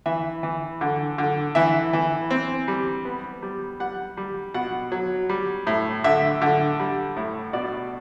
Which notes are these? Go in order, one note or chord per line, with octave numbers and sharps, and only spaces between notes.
E3 E5
E3
D3
D3
E3 E5
E3
C4
G3
B3
G3
G3 F#5
G3
B2 F#5
F#3
G3
A2
D3 E5
D3
G3
A2
B2 D5